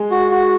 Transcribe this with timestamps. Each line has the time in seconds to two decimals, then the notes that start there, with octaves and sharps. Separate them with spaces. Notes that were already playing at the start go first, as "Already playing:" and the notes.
Already playing: G#3
0.11 F#4
0.31 F#4